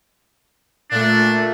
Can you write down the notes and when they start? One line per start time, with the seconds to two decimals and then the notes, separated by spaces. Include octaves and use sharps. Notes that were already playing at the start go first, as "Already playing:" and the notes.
0.91 A#2 A3 D4